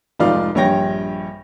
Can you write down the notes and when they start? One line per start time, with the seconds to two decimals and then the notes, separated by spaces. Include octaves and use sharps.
0.19 F1 G#2 D#4 F4 D5 F5
0.55 A#1 G2 C#5 G5 A#6